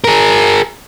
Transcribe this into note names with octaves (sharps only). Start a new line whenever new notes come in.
G#4 A#4